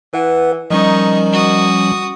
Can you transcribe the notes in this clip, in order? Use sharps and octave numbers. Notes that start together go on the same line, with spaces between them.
E3 B4 F#5
D#3 F3 G3 C#4 D#4 C#6
F#4 D#6